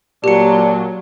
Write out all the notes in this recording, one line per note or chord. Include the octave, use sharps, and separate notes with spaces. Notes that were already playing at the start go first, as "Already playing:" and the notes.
A#2 F#3 D4 G4 C#7